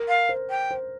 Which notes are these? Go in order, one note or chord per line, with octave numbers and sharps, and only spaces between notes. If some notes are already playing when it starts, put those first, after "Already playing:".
Already playing: A#4
F5
C5
G5
C5